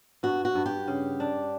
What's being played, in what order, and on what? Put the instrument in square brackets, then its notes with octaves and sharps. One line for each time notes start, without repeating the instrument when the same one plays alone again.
[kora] G2 [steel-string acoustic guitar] F#4
[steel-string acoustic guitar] F#4
[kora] G2
[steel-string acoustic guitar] G4
[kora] C#3
D4